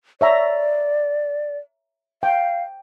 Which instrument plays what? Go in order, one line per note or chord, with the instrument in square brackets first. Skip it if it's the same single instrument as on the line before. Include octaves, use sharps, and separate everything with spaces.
[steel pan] C#5 E5 A#5 [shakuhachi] D5
[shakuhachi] F5 [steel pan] G5